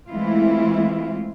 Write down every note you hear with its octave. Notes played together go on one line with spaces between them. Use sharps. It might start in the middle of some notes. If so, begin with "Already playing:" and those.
E3 G#3 A3 C4 E4 F4